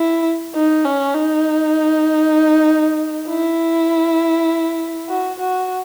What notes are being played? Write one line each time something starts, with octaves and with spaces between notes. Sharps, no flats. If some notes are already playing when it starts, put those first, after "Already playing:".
Already playing: E4
D#4
C#4
D#4
E4
F#4
F#4